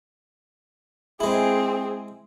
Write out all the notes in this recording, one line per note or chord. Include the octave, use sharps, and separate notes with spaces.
G#3 C4 E4 G#4